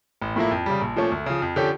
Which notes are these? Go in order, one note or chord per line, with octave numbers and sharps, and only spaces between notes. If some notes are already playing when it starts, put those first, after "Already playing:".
A1
A2 F3 A#3 E4
F2
C#3 G3
A#1
A#2 F3 A3 C#4
D2
C#3 F3
F2
D3 F3 C#4 G4